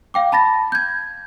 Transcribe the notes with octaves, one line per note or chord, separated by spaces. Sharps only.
F5 G5 D6
A5 B5 A6 A#6
G6 G#6